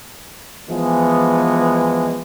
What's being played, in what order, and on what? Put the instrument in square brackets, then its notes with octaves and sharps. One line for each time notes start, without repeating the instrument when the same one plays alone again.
[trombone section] E3 F3 G#3 B3